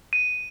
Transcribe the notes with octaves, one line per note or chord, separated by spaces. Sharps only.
D#7